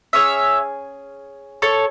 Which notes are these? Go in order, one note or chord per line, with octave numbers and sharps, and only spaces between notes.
C#4 G#4 C#5 E5
A4 C#5